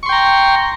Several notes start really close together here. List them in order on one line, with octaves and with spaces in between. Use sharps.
C#6 C6 G5 A#5